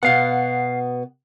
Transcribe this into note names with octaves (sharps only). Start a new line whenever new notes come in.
B2 B3 F5 F#5